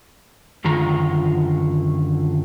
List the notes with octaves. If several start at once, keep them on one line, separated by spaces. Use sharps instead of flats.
F#2 D3 D#3 F4 A#5